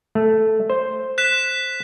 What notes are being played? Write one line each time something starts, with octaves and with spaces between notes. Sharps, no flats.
A3
C5
F#6 B6 E7